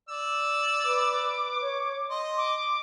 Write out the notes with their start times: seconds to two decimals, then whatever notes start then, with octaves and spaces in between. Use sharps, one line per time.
0.09 D5 E6
0.84 B4 D6
1.17 B4
1.61 C#5
2.10 D#5 C6
2.37 D6